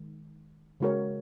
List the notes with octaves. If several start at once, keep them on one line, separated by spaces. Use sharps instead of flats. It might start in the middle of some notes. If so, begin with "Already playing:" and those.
Already playing: D#3 G#3
C#3 G#3 F#4 A#4 C#5